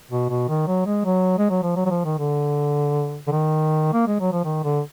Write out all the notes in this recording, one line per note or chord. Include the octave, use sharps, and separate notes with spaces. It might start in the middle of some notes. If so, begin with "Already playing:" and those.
B2
B2
D#3
F#3
G#3
F#3
G#3
F#3
F3
F#3
F#3
F3
D#3
D3
D3
D#3
A#3
G#3
F#3
F3
D#3
D3